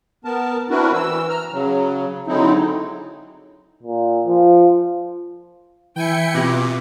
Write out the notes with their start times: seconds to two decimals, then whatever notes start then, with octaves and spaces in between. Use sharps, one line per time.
0.25 B3 A#4 A5
0.70 C4 D4 E4 F#4 A#4 B4
0.94 E3 E6
1.29 A#5 F6
1.52 C#3 F#3
2.28 D3 F#3 G#3 C4 D#4 E4
3.83 A#2
4.26 F3
5.96 E3 E4 G5 G#5 C#7
6.34 B2 C4 F4 G4 D6